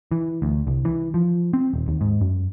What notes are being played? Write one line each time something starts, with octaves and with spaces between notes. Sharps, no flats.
E3
D2
C2
E3
F3
C4
D#1
D#2
G#2
F#2